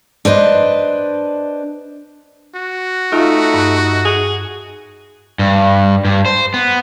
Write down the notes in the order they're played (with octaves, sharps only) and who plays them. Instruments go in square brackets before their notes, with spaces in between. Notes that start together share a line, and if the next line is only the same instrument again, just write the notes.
[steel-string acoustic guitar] D4 B4 C5 D#5
[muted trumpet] F#4
[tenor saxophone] A3 [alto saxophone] D#4 [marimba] F4 F5
[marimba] G2
[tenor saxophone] G#4
[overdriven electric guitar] G2
G2
C5
B3